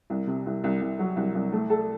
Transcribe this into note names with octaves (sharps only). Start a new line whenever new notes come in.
C2
C3
C2
C2
C2
F#3
C2
C2
A3
A4